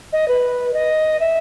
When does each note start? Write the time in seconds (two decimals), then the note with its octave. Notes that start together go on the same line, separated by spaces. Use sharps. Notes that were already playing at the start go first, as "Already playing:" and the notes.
0.13 D#5
0.28 B4
0.74 D#5
1.20 E5